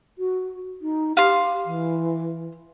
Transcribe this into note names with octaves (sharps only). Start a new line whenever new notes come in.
F#4
D#4
G4 F5 C6
E3